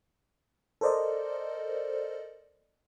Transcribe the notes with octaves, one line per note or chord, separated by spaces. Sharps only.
A4 A#4 C5 D5 D#5